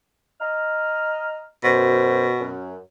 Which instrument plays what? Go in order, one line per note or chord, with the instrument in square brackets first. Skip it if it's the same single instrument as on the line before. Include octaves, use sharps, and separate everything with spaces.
[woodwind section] D#5 A#5 F6
[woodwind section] F#2 C5 [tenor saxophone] B2
[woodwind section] F#2